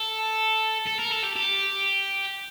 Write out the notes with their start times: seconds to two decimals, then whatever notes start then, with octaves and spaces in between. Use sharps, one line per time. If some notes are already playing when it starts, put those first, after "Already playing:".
Already playing: A4
0.87 A4
0.99 A#4
1.12 A4
1.24 G4
1.36 G4